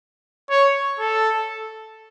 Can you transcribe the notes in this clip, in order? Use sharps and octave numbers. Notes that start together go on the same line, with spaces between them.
C#5
A4